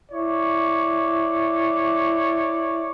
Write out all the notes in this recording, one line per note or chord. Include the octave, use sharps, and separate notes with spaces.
E4 C#5 D5